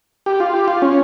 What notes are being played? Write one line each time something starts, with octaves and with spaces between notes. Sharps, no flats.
G4
F4
G4
F4
C#4